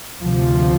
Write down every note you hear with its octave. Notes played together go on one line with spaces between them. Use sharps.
D2 C3 F3